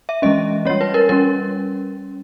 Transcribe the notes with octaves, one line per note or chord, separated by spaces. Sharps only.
E5
E3 G#3 C#4 D#5
G3 C#4 C#5
B4
A#4
G3 C#4 A#4